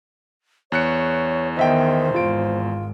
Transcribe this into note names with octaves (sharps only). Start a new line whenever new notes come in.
E2 C#5 F#6 C#7
D#3 B3 C5 D#5 E5 G5
G#1 G#2 F4 D7